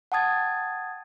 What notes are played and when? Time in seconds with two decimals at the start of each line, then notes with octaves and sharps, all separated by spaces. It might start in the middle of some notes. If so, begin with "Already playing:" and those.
0.12 F#5 G5 A5 D#6 G#6 A6